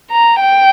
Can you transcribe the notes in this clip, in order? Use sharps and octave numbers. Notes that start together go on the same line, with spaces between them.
A#5
G5